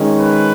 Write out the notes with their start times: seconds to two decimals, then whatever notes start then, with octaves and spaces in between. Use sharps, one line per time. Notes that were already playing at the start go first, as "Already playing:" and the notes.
Already playing: D#3 G#3 C#4
0.20 B4